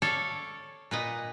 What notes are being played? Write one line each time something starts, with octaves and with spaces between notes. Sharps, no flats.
A4 C#5 D5 F5
A#2 B4 D#5